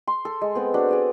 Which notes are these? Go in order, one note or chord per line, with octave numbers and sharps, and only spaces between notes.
C6
A4
G#3
B3 C4 A4
D4 F#4
G#4 D5 D#5